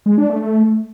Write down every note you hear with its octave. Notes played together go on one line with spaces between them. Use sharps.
G#3
D4
A3
A3